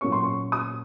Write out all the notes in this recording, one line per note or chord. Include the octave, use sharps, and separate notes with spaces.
A#2 F#3 A#3 C#4 C#6
C6
C#6
D#6